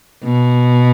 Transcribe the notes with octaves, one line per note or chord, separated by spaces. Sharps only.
B2